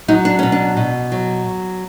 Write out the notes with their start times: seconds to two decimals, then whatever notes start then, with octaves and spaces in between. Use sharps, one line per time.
0.08 F#3 D#4
0.25 D4
0.39 B2 C#4
0.52 D4
0.77 B2
1.12 F#3